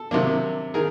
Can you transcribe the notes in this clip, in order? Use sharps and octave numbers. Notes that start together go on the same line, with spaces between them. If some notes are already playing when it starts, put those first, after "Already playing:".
Already playing: A4
C3 D#3 F#3 A#3 D4
D#3 G#4 A#4